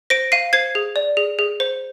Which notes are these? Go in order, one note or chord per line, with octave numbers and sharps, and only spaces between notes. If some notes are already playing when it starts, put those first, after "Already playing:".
C5 A#6 D7
F5 C7 D#7
C5 G#6 C7
G#4
D5
G#4
G#4
C5